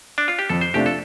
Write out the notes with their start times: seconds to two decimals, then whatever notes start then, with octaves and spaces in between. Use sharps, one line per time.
0.18 D4
0.28 F4
0.39 G4
0.49 F2 A4
0.61 C5
0.74 C3 A3 D4 F4 G4
0.86 A4